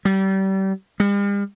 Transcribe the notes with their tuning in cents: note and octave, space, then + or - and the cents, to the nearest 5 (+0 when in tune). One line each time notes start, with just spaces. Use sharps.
G3 -30
G3 +45